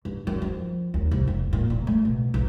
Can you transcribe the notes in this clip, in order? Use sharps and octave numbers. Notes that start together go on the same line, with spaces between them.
G2
F#2
F3
D#2
C2
F1
A#2
A#2
A3
B2
B1